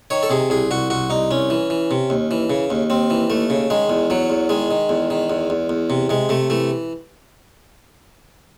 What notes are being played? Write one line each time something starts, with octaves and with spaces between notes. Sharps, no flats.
D#3 C#5
A4
C3 G#4
C2 G#4
C2 F#4
C2 F#4
C2 D#4
C2 C#4
E3
E3
C3
D#2
E3
C#3
D#2
D#2 C4
E3
D#2 A3
C#3
D#3 G#3
E2
E2 F#3
E2
D#3 G#3
D#3
E2
D#3
E2
E2
E2
C3
C3 G#3
C3 A3
E3 A3